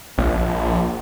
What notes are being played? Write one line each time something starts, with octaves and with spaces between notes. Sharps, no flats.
A#1